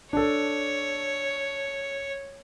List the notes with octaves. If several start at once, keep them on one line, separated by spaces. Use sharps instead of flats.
D4 A4 C#5